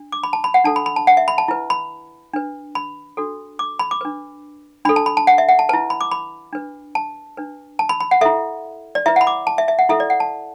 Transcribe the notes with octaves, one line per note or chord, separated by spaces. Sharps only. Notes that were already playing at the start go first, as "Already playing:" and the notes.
Already playing: D4
D6
B5
A5
B5
F#5
D4 A4 A5
B5
B5
A5
F#5
E5
B5
A5
E4 B4
B5
D4 B4
B5
D4 F#4 A4
D6
B5
D6
D4 B4
D4 A4 B5
A5
B5
A5
F#5
E5
F#5
A5
E4 B4 A5
B5
D6
B5
D4 B4
A5
D4 B4
A5
B5
B5
F#5
E4 A4 E5
D5
E4 B4 E5
F#5
B5
D6
A5
E5
E5
F#5
E4 A4 E5
D5
F#5
A5